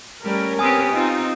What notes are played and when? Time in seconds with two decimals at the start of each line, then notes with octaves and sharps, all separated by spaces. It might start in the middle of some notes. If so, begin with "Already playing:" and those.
0.24 G3 A3 C#4 A#4
0.59 B3 C4 G4 G#5 D#6
0.94 C4 D#4 F4